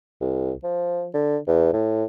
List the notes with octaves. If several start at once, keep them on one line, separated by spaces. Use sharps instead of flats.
C2
F3
D3
E2
A2